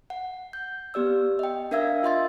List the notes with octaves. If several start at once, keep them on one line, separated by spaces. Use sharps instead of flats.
F#5
G6
B3 G4 D5 E6
D#5 G5
D4 A#4 E5 F5 E6 G#6
F4 D#5 C6 A6